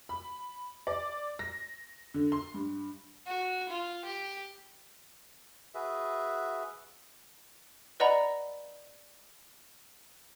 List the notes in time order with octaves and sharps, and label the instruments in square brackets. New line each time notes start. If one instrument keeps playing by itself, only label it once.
[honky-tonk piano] B5
D5
A#6
D3
C6
G2
[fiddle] F#4
F4
G4
[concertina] F#4 G#4 B4 E5
[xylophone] B4 D5 D#5 F#5 A#5 B5